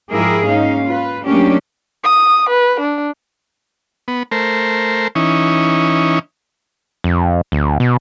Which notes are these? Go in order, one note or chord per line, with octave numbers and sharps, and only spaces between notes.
G#2 F3 E4 G4 G#4 A#4
A#3 C#4 D#4 F5
F4 B4
F#3 A3 A#3 C#4 D4 G4
D#6
B4
D4
B3
A3 A#4 C5
E3 C#4 D#4
F2
D2
B2